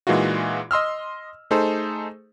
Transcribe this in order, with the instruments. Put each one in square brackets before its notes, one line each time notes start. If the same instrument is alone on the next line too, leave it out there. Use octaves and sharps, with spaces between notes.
[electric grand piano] A#2 E3 G#3 D#4 F4 F#4
D#5 C6 E6 F6
A3 D#4 G#4 A4 C5